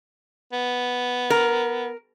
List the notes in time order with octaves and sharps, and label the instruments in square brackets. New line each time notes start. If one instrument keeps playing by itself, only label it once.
[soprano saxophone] B3
[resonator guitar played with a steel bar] A#4